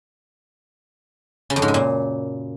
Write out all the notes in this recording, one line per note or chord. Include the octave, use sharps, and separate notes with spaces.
C#3
F2
G#2
F#2
A#2